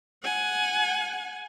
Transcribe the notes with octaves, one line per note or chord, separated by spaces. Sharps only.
F#5 G#5